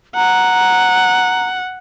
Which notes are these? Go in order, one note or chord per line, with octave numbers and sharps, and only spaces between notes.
F#5 A#5